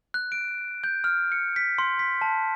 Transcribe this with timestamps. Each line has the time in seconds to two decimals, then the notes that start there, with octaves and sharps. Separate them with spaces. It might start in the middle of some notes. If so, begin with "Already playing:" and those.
0.14 F#6
0.32 D7
0.84 G6
1.04 F6
1.32 C#7
1.56 B6
1.78 C6
1.99 B6
2.21 A5